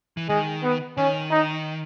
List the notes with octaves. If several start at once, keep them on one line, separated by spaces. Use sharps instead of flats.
E3
D#3 G#3
B3
D#3 C#4
D#4